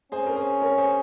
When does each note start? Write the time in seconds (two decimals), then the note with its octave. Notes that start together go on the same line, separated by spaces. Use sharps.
0.12 C#4 G#4 C5
0.26 A#4
0.36 G#4 C5
0.62 A#4 C#5
0.78 G#4 C5